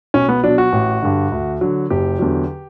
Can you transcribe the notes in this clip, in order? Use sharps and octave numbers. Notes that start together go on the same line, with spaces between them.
B1 C#4
B3
B2 F#3 D4
F#4
A1
G2 D3
D2
D3 F#3
F#1 G4
E2 D3 F#3